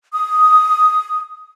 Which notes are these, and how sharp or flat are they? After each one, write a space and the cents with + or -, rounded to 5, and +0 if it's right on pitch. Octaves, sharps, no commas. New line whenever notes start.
D#6 +5